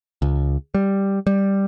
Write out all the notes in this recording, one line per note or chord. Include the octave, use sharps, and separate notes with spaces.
C#2
G3
G3